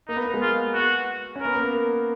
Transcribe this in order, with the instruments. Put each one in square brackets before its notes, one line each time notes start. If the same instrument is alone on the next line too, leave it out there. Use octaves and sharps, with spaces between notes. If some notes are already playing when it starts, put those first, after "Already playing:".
[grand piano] A#3 [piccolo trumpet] D#4
[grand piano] B3
A#3
G#3
[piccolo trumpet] F4
F#4
[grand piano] C#4
[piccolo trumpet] A#4
[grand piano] B3
A#3